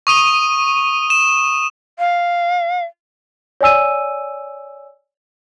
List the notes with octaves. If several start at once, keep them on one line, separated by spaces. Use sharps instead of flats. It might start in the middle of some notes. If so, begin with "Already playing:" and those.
C#6 D#6 D#7 G7
E7
F5
C#5 D5 G#5 E6 D#7